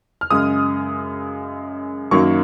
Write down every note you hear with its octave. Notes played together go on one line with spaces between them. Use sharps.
F6
F#2 C#3 G#3 D#6
F#2 D#3 F#3 A#3 C#6